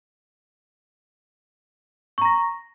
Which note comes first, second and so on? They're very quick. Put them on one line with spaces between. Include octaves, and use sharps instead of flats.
C#6 A#5 A#6